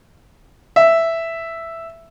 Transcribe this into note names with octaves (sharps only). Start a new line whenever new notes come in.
E5